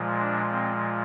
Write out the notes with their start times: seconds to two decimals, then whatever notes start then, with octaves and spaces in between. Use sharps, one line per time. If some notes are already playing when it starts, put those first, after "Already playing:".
Already playing: A#2 F3 G#3
0.19 D4
0.51 C4